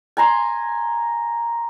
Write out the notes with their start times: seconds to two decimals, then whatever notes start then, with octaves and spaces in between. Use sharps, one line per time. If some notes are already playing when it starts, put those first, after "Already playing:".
0.17 G#5 A#5 C6